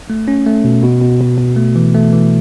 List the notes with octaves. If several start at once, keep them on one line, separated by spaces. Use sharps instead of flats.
A3
C#4
A3
B2
B2
B2
B2
B2
A3
E3
A3
E3